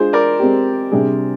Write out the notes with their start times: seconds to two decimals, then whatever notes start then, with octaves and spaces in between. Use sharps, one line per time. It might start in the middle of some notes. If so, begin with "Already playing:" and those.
Already playing: G#3 D4 F4 G#4 C5
0.13 A#4 D5
0.39 G#3 C4 G4
0.91 C3 G3 D4 G#4